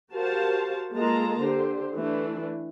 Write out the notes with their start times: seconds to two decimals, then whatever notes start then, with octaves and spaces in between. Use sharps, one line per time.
0.11 F#4 G4 A#4 C5 F5 A5
0.95 G#3 A#3 F4 A4 A5 A#5
1.41 D3 G4 C5
1.96 E3 A3 D4